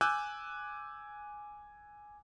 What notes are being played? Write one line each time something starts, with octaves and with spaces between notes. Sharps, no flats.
G#5 D6 E6 F#6 G6